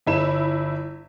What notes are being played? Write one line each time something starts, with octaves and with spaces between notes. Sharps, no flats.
G1 E4 E7